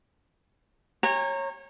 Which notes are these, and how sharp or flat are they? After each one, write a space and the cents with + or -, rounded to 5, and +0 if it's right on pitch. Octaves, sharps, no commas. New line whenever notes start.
C#5 -20 G5 +45 A#5 -15